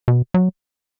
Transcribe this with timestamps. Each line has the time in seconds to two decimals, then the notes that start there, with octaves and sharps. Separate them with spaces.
0.08 B2
0.34 F#3